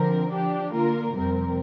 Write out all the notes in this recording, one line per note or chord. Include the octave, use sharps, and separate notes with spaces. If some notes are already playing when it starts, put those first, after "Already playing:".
Already playing: D3 F3 C4 A#4
F3 D4 G4
D3 A#3 F4 A#4
F2 C3 G3 C4 A#4